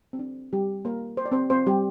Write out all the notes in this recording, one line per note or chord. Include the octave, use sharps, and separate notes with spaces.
C4
D4
G3 G4
A#3 A#4
C5
D5
C4 C5
C4 C5
G3 G4